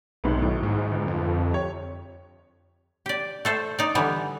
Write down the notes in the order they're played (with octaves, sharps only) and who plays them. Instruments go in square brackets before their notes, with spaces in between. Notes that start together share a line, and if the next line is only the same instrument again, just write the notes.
[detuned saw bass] B1 [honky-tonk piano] G#2 C3 B3
[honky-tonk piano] G#1 A2 F#3
[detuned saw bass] G#2
[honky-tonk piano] G1
[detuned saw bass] F2
[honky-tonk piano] G4 C#5
[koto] G4 D5
A3 A4 C5
D#4 D5
D3 E3 G3 B3